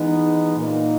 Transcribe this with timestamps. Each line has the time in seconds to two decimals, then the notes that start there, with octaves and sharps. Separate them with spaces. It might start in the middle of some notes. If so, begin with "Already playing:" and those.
Already playing: E3 G#3 B3 D#4
0.57 A#2 A#3 D#4